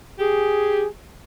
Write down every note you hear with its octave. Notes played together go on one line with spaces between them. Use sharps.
G4 G#4